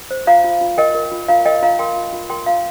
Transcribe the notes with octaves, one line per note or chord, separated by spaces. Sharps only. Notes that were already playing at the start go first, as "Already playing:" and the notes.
C5
F4 F5 A#5
F4
F4
A#4 D#5 G5
A#4
F4
F4 F5 A#5
A#4 D#5 G5
F4 F5 A#5
A#4 G5 C6
F4
F4
A#4 G5 C6
F4 F5 A#5